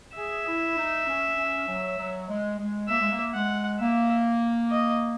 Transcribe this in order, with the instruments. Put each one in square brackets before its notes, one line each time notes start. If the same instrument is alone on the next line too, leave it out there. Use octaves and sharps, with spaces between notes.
[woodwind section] G#4 [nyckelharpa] E5
[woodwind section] E4
D#4
C#4
C#4
F#3
F#3
G#3
G#3
[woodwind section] A#3 [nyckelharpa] E5
[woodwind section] G#3
A#3
[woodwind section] G#3 [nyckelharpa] F#5
[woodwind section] A#3 [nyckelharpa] E5
[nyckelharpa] D#5